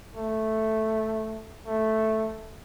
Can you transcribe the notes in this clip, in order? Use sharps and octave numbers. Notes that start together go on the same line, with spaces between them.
A3
A3